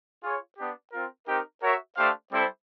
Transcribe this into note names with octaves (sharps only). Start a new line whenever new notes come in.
F4 G#4 C#5
B3 D4 G4
C4 F4 A#4
C4 D#4 G4 A#4
F#4 A#4 C#5 E5
A3 D4 G4 C5 F5
G3 C4 E4 A4 C5